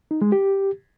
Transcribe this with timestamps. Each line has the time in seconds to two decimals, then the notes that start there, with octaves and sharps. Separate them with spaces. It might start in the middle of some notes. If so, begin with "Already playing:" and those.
0.11 D#4
0.22 G#3
0.32 G4